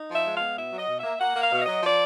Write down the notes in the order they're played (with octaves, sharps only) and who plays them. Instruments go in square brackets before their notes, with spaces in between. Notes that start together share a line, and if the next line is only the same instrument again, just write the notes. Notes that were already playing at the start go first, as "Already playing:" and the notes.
Already playing: [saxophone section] D#4
F3
E5
G#3
F5
B3
B2 E5
F#3 D#5
B2
A#3 E5
A#3 F#5
A#3
F5
B2
E5
F#3 D#5
F3 D5